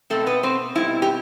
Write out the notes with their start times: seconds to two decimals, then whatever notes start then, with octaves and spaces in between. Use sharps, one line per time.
0.10 B2 G3 A3 C4 A4
0.26 B3 B4
0.43 C4 C5
0.75 B2 G3 C4 E4
1.02 G4